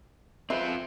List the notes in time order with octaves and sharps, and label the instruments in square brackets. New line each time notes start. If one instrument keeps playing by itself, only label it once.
[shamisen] G#3 B4 E5 [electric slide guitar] C4 F4 C5